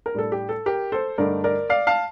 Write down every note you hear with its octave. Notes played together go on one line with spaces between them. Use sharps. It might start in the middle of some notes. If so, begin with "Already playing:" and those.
A#4
A2 G3 D4 A4
G4
A4
G4 A#4
A4 C5
G2 D3 A3 D#4 A#4 D5
A#4 D5
D5 F5
F5 A5